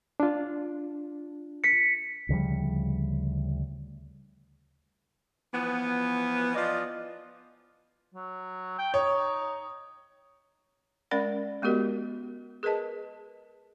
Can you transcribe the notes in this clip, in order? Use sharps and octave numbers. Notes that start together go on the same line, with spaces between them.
D4 F4
B6 C#7
D2 C#3 F3 G3
E3 F3 B3
F3 F4 D5 D#5
F#3
G5
D#4 C#5
G#3 C#4 A#4 D5 F#5 B5
G#3 B3 F#4 G4 A#4 D#5
G#4 A#4 B4 D#5 A5